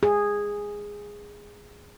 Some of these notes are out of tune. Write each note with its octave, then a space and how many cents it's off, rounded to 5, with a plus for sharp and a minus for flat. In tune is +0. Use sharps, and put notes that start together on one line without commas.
G#4 -10